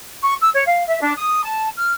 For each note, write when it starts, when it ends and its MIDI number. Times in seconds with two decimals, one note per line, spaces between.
0.23 0.35 85
0.41 0.50 88
0.54 0.63 73
0.66 0.87 77
0.89 1.01 76
1.01 1.13 62
1.17 1.44 87
1.44 1.69 81
1.77 1.92 89